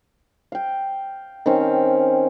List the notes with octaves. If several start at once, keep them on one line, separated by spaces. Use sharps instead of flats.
F5 G5
D#3 C4 C#4 F5